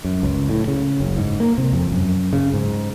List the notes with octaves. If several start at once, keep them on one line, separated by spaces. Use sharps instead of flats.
F#2
C#2
A2
C#3
F#1
G#2
A#3
C3
F2
F#2
C#3
G#2